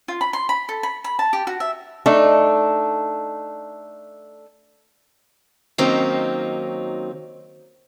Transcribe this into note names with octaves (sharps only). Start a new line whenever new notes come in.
F4
B5
C6
B5
A4
B5
B5
A5
G4
F#4
E5
A3 D4 D#4
D#3 F#3 A#3 C4 C#4 D#4